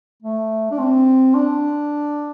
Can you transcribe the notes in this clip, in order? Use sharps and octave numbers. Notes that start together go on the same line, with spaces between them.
A3
D4
C4
D4